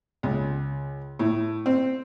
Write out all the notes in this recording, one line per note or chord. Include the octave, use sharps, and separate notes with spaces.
C#2
A2
C4